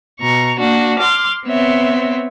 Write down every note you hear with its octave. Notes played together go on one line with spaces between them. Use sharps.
B2 A#5 C#6
A#3 D4 F#4
C6 D6 F6
B3 C4 C#5 E5